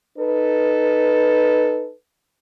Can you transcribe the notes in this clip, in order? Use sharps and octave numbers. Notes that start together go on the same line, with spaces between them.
D#4 A4 B4